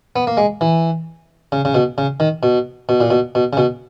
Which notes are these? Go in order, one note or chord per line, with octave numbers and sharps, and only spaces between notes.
B3
A#3
G#3
E3
C#3
C#3
B2
C#3
D#3
B2
B2
A#2
B2
B2
C#3
B2